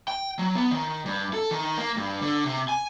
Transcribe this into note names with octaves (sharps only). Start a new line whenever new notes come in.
G5
F#3
B3
D#3
G2
A4
D#3
A#3
G2
D3
C3
G#5